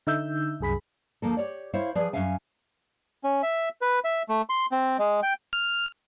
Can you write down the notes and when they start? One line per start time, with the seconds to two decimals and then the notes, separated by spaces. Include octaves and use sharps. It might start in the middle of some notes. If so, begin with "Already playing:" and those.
0.07 D3 D#4 E5 E6 G6
0.60 C2 F#2 G#4 B5 B6
1.22 D2 F3 A#3 A4
1.37 G4 C#5 D5
1.73 E4 C5 C#5 E5 F5
1.95 F3 G#4 B4 D5
2.13 F#2 D#3 C#4 E5 F5 G#5
3.24 C#4
3.43 E5
3.81 B4
4.04 E5
4.29 A3
4.49 C6
4.72 C4
4.99 G#3
5.23 G5
5.53 F6